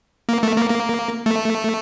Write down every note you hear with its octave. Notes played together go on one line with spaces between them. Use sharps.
A#3
A3
A#3
A#3
A3